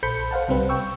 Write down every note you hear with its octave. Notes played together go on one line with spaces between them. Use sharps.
A#1 A4 C5 B5 G6 C#7
C5 F5 F#5 A5
C2 C3 G3 C4 B4
G5 C#6 E6